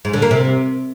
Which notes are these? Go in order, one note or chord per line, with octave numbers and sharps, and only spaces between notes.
G#2
D3
A#3
C3